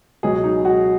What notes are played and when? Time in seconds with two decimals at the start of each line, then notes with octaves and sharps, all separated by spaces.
0.23 C#2 B2 F#3 G#4
0.44 D#4
0.65 F#4